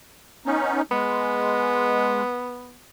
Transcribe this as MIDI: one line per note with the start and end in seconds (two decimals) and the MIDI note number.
0.46 0.82 59
0.46 0.82 61
0.46 0.82 63
0.91 2.22 56
0.91 2.79 59